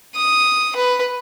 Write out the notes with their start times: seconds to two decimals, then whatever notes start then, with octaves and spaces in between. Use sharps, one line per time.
0.16 D#6
0.75 B4